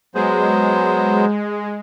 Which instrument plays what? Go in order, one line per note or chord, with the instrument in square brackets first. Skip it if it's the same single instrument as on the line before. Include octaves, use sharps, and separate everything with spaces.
[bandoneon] F#3 B3 C5 [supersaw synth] G#3